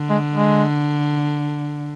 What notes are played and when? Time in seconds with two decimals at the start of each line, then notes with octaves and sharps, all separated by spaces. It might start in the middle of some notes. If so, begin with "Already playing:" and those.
Already playing: D3
0.09 G#3
0.34 G#3